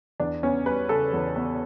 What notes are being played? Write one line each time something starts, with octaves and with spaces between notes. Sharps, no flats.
E2 D4
B3 C#4
G3 B4
C#3 A4
E2
B3